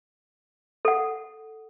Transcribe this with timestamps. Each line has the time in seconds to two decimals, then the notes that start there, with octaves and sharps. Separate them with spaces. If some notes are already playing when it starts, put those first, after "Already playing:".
0.85 A4 F#5